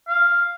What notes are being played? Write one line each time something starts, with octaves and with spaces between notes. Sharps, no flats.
F5